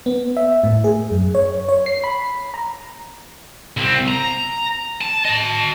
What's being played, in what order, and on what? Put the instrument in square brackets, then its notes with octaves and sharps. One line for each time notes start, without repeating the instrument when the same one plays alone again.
[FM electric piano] B3
E5
A2
G#4
F#2
C#5
C#5
C7
B5
A#5
[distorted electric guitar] C2 C4
A#5
A5
D#5 A5